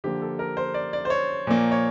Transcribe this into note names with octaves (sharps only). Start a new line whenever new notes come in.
D3 F3 A#3 G4
A4
A#4
C5
D5
D5
C5
C#5
A#2 F3 A#3
C#5